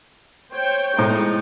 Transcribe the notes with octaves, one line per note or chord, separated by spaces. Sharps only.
C5 C#5 G5
A2 G#3 D#4 C5